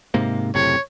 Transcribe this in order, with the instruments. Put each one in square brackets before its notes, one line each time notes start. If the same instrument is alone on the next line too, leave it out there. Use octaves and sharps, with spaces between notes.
[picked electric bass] G#2 C3 A#3
[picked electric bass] F#1 A2 C3 [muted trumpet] C#5